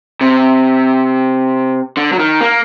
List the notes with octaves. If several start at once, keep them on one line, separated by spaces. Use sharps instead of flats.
C3
D3
F#3
D#3
A#3